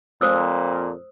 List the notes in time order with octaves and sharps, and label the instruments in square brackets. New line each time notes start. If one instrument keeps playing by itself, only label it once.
[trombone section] F2 A#2 [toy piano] C5 D#6 E6